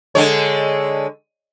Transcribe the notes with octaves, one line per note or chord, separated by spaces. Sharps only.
D3 G#3 C#5